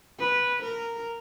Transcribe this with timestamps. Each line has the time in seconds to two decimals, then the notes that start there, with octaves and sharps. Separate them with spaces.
0.19 B4
0.62 A#4